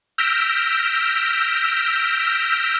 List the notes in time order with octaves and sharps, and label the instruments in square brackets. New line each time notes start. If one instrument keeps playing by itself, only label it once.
[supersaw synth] E6 F6 G6 A#6 B6 D7